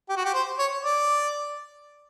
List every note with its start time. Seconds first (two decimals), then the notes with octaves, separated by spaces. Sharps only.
0.09 G4
0.16 F#4
0.25 G4
0.34 C5
0.58 C#5
0.84 D5